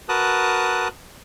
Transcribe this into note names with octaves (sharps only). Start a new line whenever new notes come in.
F#4 A#4 B4 A5 D#6 F#6